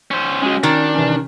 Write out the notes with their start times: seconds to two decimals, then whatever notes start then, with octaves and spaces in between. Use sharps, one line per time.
0.11 C#4 C5
0.42 C#2 G#3 C#4 F#4
0.63 D#3 D4
0.94 C3 E3 C#4